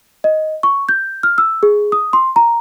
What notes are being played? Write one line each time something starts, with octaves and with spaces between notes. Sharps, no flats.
D#5
C#6
G6
F6
E6
G#4
D#6
C6
A#5